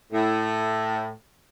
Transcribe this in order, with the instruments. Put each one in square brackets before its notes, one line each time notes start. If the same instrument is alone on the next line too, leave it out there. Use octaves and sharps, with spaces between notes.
[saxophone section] A2